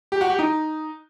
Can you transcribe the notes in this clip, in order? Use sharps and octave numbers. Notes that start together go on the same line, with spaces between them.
G4
F#4
G4
D#4